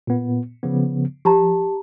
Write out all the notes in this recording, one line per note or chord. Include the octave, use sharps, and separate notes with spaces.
A#2 B3
C#3 F3 B3
F3 G4 A5 A#5